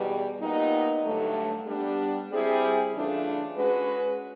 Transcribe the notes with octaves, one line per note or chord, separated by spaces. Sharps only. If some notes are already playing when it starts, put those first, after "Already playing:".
Already playing: E2 B2 G3
A#2 G3 B3 D#4
G2 D3 F#3 A3
G3 B3 D4
G3 C4 E4 G#4
C#3 E3 A3 D4 F4
G#3 C#4 F#4 B4